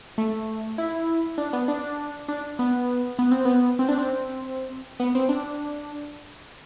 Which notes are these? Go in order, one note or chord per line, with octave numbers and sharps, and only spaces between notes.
A3
E4
D4
B3
D4
D4
B3
B3
C4
B3
C4
D4
C4
B3
C4
D4